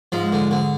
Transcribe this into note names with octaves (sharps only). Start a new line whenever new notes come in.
G#2 F3 G#3
D3
D3